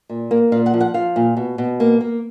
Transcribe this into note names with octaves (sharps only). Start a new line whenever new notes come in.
A#2
A#3
A#2 F5
F#5
F3
F#5
F3 F5
A#2
B2
B2
A#3
A#3